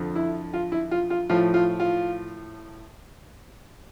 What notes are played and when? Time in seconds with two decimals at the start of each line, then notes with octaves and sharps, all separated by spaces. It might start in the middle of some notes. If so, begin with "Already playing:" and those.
Already playing: F2 D3 F3
0.16 E4
0.54 F4
0.72 E4
0.91 F4
1.10 F4
1.30 A2 F3 F4
1.54 F4
1.80 F4